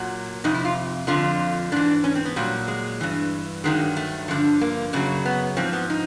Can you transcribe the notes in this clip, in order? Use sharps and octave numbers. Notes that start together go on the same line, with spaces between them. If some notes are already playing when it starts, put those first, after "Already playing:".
Already playing: A#2 F#3
F2 C3 D#4
E4
F4
F2 D3 F3 F4
G#2 E3 D4
C#4
C4
B3
A#2 F#3 G3
G#3
G2 E3
G2 D#3 F#3 G#3
A3
G2 D3 F3
A#3
F#2 C#3 F#3 A#3
B3
G#2 F3 C4
B3
D#4